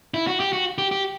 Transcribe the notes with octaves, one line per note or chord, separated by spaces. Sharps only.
E4
F#4
G4
F#4
G4
G4